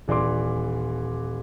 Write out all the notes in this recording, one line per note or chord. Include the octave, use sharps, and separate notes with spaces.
D#1 E3 D5 C6 D6